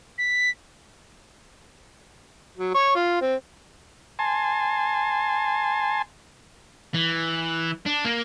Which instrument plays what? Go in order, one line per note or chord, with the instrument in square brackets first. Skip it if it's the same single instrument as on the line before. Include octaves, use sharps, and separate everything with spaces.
[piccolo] B6
[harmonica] F#3
C#5
F4
C4
[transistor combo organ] G#5 A5 C6
[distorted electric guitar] E3
D4
A#3